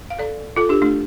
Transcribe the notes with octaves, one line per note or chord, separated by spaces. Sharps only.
F5
A4 D5
F4 A4
D4 G4
A3 D4